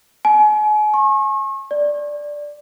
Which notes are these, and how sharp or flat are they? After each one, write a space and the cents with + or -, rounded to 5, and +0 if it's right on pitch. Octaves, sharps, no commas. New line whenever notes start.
G#5 +35
C#6 -40
D5 +0